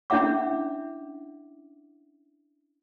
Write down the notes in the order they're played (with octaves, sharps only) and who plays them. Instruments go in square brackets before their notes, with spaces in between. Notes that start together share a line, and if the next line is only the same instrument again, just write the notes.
[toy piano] C#4 D4 E4 E5 F#5 D6